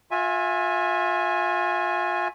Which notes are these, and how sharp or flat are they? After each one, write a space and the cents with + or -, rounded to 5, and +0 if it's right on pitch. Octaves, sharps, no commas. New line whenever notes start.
F4 +35 E5 +0 G#5 -5